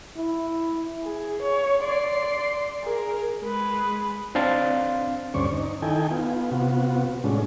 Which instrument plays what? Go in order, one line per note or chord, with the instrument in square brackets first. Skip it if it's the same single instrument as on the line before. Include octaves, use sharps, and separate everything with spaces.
[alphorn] E4
[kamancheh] G#4
C#5
D5 C6
G#4 A#4
[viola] G#3 B4
[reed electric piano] C4 D4 F5 C6 A6
[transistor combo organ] D2 G2 C#4 C5 D5 C#6
D#4
D#3 D#4 E4 A4 G5 G#5
B3 F4
C3 B3 F4 F#4
A2 G#3 C#4 D4